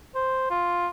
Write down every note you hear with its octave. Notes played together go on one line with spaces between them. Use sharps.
C5
F4